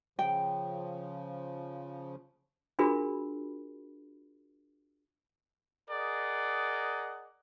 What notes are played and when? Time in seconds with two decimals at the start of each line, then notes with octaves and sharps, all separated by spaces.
0.19 C#3 F3 G5
2.79 D4 F4 F#4 G#4 A#4 B5
5.89 G#4 A#4 D5 D#5 F#5